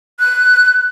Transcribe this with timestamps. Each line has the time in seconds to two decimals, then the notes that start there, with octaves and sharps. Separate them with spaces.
0.20 F#6